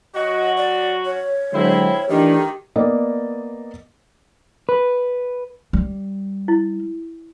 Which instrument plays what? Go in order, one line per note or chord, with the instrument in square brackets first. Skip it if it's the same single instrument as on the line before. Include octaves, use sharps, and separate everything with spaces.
[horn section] F#3 F#4 [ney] D#5
[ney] D5
C#5
[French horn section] D3 F#3 G#3 [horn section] C4 E4
[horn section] D#3 [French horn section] E3 A3 D4 [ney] G4
[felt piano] A#3 B3 D5 D#5
[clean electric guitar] B4
[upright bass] G3
[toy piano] E4